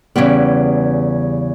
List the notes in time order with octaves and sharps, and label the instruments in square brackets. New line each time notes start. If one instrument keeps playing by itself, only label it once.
[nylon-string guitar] E2 C#3 G3 B3